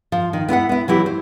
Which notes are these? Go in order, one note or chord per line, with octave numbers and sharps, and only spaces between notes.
F3
D#3
B3 E4 B4 F#5
B3 E4
E3 F#3 E4 G4
C5